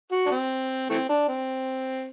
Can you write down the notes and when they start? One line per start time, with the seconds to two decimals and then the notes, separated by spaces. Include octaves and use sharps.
0.12 F#4
0.26 D4
0.31 C4
0.90 E3 A3 C4
1.09 D4
1.28 C4